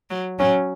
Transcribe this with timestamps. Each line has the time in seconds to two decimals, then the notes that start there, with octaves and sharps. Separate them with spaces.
0.10 F#3
0.39 F#3 C#4